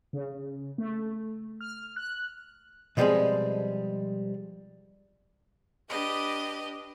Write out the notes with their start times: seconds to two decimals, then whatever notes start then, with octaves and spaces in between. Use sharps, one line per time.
0.13 C#3
0.78 A3
1.61 F6
1.96 F#6
2.97 B2 F3 G3 G#3 C4 G#4
5.88 D4 G4 B4 D#5